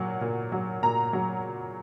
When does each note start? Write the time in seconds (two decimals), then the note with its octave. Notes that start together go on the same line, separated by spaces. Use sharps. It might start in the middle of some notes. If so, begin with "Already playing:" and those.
Already playing: A#2 F#3 F#5
0.21 A#2
0.52 F#3
0.82 A#2 A#5
1.13 F#3